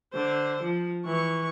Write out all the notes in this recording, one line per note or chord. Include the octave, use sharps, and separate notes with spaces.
D3 C5
F3
E3 C#6